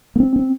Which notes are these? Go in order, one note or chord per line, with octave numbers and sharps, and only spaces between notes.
A#3
C4
C4